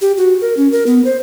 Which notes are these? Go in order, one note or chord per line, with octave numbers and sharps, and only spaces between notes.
G4
F#4
A#4
C#4
A#4
B3
C5